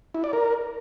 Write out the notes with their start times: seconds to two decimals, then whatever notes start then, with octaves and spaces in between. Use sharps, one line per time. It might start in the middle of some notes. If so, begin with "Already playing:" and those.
0.15 E4
0.24 D5
0.33 A#4